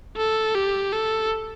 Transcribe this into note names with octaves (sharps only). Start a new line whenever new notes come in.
A4
G4
A4